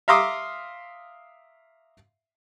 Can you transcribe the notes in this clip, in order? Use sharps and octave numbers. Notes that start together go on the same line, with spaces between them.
E5 F5 A#5 C6 D6 D#6